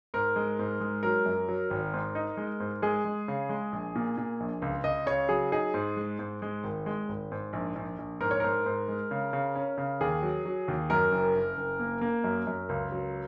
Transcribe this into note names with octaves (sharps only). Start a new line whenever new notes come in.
G#2 A#4
G#3
G#2
G#3
F#3 A#4
F#2
F#3
G#1
G#2
D#4
G#3
G#2
G#3 G#4
G#3
C#3
G#3
A#1
A#2
A#2
A#1
C#2
C#2 D#5
C#3 C#5
F#3 G#4
D#4 G#4
G#2
G#3
G#2
G#3
G#1
G#3
G#1
G#2
A#1
A#1
A#1
G#2 A#4
C#5
G#2 A#4
G#2
G#3
C#3
C#3
C#4
C#3
D#2 G#4
F#3
F#3
D#2
F#2 A#4
F#1
F#1
F#1
A#3
A#3
F#2
F#2
C#2
F#3